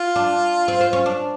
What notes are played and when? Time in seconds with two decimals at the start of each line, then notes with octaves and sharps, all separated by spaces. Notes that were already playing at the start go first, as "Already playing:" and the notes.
Already playing: F4
0.16 D4
0.68 C4
0.81 C4
0.93 C#4
1.06 D4